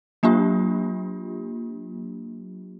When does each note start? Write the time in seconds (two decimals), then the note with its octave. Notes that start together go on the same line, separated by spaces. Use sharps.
0.23 F#3 A#3 D4 F4 G4